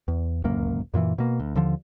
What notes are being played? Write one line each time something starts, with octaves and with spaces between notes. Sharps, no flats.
E2
D1 C#2 F#2 A#3
F#2 A#2 C#3 E3
B2 A#3
D2
D#2 D3 F3